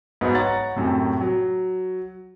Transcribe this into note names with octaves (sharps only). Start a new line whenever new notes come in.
G#2 F#3 B3
C#5 F#5 A#5 A6
F#2 A2 C3
F#3